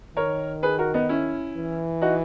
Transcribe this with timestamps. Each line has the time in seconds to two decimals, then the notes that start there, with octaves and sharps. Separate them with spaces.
0.17 D#3 A#4 C#5
0.63 G#4 B4
0.78 F#4 A#4
0.94 B3 D#4
1.09 C#4 E4
1.56 E3
2.02 D#4 F#4